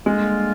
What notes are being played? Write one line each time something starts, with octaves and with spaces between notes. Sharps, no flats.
D3 G3 G#3 A#3 D4 F4